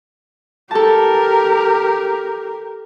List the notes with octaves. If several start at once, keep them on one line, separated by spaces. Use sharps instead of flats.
G4 A4 A#4 A5